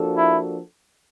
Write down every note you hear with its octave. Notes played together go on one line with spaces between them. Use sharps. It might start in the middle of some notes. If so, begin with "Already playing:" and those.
Already playing: F3 A#3 D4 F#4 A4
E4